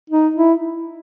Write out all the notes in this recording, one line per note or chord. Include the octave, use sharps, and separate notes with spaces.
D#4
E4